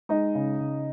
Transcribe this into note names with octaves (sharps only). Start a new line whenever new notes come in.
G#3 D#4 D#5
C#3
C#3